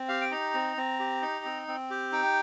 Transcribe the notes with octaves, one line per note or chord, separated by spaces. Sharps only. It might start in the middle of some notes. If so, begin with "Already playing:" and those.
Already playing: C4
G4 F5
G5
D#4 A#5
C4
C4
G4
D#4
C4
C4
G4
D#4 G5